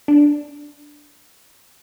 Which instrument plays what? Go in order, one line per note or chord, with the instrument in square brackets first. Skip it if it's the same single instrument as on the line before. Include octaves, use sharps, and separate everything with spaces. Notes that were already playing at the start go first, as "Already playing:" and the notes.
[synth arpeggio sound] D4